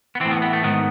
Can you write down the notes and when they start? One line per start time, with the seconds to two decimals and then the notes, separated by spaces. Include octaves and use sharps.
0.15 B3
0.20 A2 E3 C4
0.31 B3
0.42 B3
0.53 A3
0.63 G#2 D#3 B3